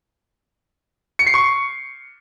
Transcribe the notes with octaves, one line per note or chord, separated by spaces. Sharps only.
C#7
C7
C#6